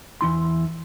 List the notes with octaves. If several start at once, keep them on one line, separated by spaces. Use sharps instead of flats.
E2 E3 E4 C6